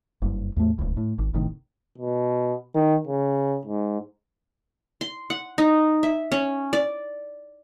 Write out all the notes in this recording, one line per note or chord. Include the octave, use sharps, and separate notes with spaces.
F#1 G2
E2 A2 A3
D1 C#2
A2
G#1
G1 A2 C3 D#3
B2
D#3
C#3
G#2
C6
F#5
D#4
E5
C#4
D5